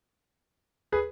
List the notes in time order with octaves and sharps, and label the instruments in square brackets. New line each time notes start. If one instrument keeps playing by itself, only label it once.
[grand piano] G#4 B4